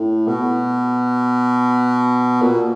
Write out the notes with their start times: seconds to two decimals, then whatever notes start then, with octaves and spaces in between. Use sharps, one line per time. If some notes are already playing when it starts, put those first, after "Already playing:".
Already playing: A2
0.27 B2
2.42 A#2